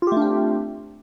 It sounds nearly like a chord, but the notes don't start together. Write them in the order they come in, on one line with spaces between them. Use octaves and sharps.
F4 G4 A3 D4 C4